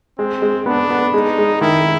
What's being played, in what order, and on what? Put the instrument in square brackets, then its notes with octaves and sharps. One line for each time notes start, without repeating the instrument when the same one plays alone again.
[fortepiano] G#3 [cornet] C4
[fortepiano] G#3
[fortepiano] B3 [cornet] D4
[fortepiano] B3
[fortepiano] G#3 [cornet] D#4
[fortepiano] G#3
[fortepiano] D#3 [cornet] E4